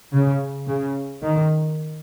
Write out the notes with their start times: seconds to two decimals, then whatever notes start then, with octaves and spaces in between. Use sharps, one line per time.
0.13 C#3
0.68 C#3
1.23 D#3